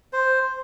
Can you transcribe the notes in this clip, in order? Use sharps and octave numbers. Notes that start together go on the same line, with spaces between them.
C5